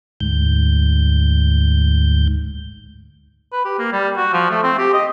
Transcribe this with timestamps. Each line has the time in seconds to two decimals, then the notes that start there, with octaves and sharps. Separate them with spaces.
0.21 D2 G#2 G6
3.52 B4
3.65 G4
3.79 A#3
3.93 G3
4.17 F#4
4.33 F3
4.51 A3
4.63 C4
4.78 G4
4.94 D#5